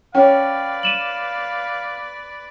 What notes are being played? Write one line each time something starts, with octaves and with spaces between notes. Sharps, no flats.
C#4 B4 D5 F5 G5
D#7 E7 F#7